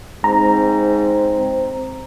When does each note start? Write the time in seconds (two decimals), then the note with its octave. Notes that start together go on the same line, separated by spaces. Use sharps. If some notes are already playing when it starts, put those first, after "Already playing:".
0.24 G#2 C4 A#5